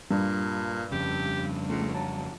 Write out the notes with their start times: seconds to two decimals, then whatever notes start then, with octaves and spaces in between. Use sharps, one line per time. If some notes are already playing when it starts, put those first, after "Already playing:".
0.11 G2 A#2 G3
0.92 F2 C#3 G4
1.70 C#2 A3
1.95 F#3 A5